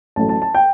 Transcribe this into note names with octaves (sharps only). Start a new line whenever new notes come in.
A1 A2 F#3 A3 A5
A5
A5
G5